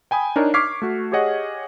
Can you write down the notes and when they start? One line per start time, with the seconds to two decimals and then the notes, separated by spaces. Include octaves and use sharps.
0.11 G5 G#5 B5 D#6
0.36 D4 D#4 A#4 C#5
0.54 C#6 D6 F6 G#6 B6 C7
0.82 A3 F#4
1.12 G4 G#4 C#5 D#5 F#5